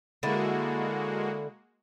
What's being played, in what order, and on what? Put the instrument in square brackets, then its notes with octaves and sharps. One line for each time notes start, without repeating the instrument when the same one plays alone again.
[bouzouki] D3 E4 [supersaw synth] G#3 A#3 F#4